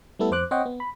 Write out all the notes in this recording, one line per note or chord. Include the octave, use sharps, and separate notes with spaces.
G3 A3 B3 E4 A4
F2 C5 D6 F#6
C4 C5 C#5 D#5 F#5 G5
B3
B5